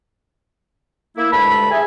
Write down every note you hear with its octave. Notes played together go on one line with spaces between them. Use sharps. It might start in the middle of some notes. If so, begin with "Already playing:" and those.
A#3 E4
D2 G2 G#3 A5 B5
G#4 E5 G#5